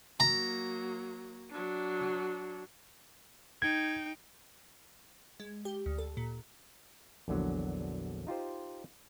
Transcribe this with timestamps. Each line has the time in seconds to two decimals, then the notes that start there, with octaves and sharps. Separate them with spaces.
0.20 F#3 A#3 A#5
1.52 F#3 D4
3.62 D#4 G5 G#6
5.40 G#3
5.65 G4
5.86 D2
5.99 A4
6.17 A#2
7.28 A#1 E2 D3 F#3
8.27 D#4 F4 G4 C5